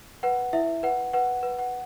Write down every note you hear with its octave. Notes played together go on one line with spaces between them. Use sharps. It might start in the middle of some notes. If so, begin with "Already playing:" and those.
B4 F#5
E4 E5
B4 F#5
B4 F#5
B4
F#5